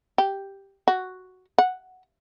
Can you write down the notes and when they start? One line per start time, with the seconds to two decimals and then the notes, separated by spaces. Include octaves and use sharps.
0.18 G4
0.88 F#4
1.58 F#5